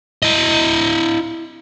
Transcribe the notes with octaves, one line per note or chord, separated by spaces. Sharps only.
E4 D#5